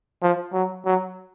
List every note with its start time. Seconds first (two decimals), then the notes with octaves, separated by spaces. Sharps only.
0.22 F3
0.53 F#3
0.86 F#3